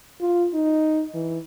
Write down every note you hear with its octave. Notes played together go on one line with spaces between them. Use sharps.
F4
D#4
E3